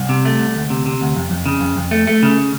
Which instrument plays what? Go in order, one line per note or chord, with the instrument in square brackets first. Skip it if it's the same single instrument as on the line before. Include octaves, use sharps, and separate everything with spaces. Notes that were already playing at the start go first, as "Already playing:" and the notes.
Already playing: [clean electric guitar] C2
C3
A3
C2
D2
C3
C3
D2
F2
F2
C#3
F2
F2
A3
A3
C#3